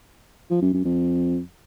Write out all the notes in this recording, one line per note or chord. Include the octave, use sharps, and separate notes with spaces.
F3
F#2
F#2
F2